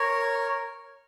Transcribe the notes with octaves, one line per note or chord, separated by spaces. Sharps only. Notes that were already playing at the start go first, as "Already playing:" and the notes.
Already playing: A#4 C#5